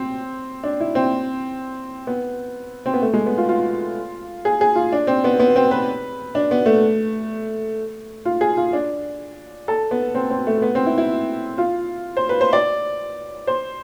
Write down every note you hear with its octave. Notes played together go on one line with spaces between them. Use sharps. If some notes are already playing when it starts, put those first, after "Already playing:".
Already playing: C4
D4
E4
C4
B3
C4
B3
A3
G#3
B3
F4
F4
G#4
G#4
F4
D4
C4
B3
B3
C4
B4
D4
B3
A3
F4
G#4
F4
D4
A4
B3
C4
C4
A3
B3
C4
E4
E4
F4
C5
B4
C5
D5
C5